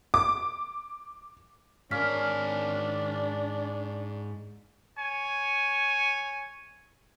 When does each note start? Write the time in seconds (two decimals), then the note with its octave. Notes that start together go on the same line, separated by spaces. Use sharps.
0.14 D6
1.91 G#2 C#4 D4 A#4 F5 B6
4.99 C#5 G#5